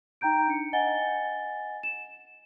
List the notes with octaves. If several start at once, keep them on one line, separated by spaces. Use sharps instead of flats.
D#4 G5 A#5 G6 D7
D4 C#7
D#5 F#5 G#5 A6 G7
E7